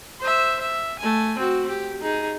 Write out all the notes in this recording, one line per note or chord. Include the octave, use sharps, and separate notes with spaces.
C5 E5
E5
A3 G#5
C4 F#4
G4
D#4 G#4